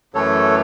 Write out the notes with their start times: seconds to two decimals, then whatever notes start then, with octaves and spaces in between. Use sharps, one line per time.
0.14 F#2 E3 A3 A4 C#5